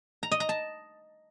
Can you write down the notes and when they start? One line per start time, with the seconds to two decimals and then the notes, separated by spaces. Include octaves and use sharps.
0.23 A#5
0.32 D#5
0.40 A#5
0.49 A5